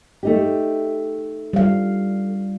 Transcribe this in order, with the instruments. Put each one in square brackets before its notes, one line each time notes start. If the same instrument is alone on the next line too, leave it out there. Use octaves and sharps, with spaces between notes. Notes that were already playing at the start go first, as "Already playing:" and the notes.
[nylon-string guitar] A3 D#4 G4
[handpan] G3 F5